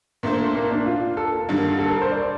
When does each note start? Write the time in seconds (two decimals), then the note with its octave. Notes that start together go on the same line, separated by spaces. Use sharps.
0.23 A#2 A3 A#3 D4 A4 C5
0.55 A#3
0.71 D4
0.86 F4
1.17 A4
1.33 A#4
1.49 G2 D3 G3 A#3
1.79 A4
1.90 A#4
2.02 C5
2.12 D5